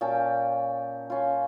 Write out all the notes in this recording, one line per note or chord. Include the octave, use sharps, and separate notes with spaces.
A#2 C#4 G5 A5
C#4 F4